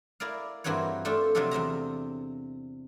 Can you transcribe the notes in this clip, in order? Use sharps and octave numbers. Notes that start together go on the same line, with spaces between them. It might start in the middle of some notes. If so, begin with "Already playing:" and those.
E4 A#4 D5 F5
G2 E3 A#3 C4 F#4 C#5
A3 C4 D4 F4
C3 F3 F#3 D4 F4 A4
E2 C4 E5 A#5